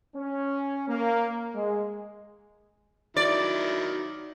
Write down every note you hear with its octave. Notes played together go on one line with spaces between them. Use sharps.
C#4
A#3
G#3
D#3 F#3 E4 D5